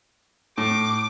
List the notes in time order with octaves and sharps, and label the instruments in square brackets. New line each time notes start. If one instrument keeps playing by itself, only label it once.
[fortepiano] A2 [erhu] D6